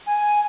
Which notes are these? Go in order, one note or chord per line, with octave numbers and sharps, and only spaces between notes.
G#5